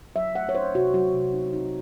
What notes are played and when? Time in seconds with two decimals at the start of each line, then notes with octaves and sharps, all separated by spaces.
0.16 F#3 E5
0.35 A3 F#5
0.49 C#5
0.55 D#4 C5
0.75 C3 F#4
0.94 F#3 F#4
1.14 C3
1.33 D#4
1.53 D#4